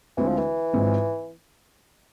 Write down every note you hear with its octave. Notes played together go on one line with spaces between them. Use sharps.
D2 D3 E3 G#3 C4 E4
F3
E3
G#1 G#2 F3 G#3 C4